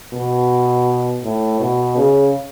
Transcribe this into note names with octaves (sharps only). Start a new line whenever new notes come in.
B2
A2
B2
C#3